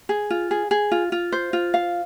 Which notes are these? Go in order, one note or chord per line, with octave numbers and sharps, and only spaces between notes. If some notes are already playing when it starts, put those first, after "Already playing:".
G#4
F4
G#4
G#4
F4
F4
C5
F4
F5